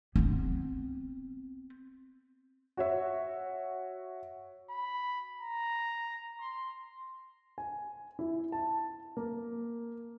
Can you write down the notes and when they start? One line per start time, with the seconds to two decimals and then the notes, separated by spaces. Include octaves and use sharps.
0.16 B3 C4
2.77 F#4 C#5 E5
4.70 B5
5.41 A#5
6.40 C6
7.58 G#5
8.19 E4
8.52 A5
9.17 A#3